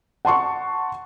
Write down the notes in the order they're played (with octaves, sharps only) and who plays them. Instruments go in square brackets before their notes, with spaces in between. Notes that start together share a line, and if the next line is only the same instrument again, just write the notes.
[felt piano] F#5 A5 C6 C#6